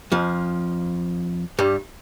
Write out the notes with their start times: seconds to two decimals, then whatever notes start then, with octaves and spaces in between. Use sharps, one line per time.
0.12 F2 F3
1.59 G2 G3